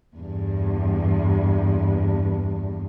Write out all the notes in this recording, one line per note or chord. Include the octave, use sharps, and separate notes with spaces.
E2 G2